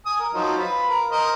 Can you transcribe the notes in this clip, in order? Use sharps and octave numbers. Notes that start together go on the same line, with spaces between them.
G#5 D#6
A#4
F3 F#3 D#4
F4 B4
A#4
A#4 C5 D#5